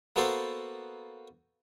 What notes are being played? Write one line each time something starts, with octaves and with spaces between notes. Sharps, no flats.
A#3 B3 F#4 A4 B4 C5